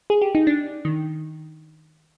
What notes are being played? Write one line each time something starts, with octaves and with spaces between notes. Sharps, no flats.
G#4
G4
D#4
D4
D#3